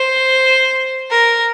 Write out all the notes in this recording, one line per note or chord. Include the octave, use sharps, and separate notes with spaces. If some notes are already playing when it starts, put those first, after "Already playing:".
Already playing: C5
A#4